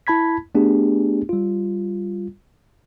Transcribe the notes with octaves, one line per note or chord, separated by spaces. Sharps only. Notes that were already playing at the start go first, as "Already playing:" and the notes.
E4 A5 B5 G#6 B6
A3 B3 D4 G4 G#4
G3 F4